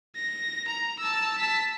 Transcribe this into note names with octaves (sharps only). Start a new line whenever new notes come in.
A#6
A#5
A5 E6
A5 B6